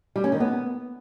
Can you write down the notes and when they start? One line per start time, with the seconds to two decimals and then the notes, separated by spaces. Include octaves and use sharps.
0.16 G3
0.24 C#4
0.32 D#3
0.40 B3